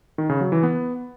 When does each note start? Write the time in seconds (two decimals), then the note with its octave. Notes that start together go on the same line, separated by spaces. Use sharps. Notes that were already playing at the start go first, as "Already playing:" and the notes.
0.18 D#3
0.29 C#3
0.41 F#3
0.52 E3
0.63 B3